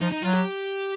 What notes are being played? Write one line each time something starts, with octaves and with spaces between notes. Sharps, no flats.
F3 D#4
D#4
F#3 F4
G4